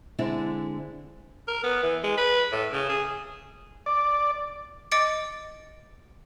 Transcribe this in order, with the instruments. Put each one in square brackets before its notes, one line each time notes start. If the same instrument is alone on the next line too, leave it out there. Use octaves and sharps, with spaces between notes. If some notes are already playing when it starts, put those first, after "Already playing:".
[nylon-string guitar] D3 G#3 C4 D4 E4
[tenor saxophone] A#4
B3
E3
G#3
B4
A2
C#3
G#4
[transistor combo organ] D5
[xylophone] D#5 D6 A6 C#7 D7